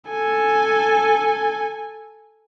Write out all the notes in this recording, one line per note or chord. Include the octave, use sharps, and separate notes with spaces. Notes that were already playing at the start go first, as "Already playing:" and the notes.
A4 G#5